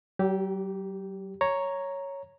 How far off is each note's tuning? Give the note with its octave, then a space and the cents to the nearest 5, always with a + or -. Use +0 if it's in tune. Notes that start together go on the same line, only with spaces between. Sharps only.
F#3 +40 G4 -10
C#5 +0 A#5 +0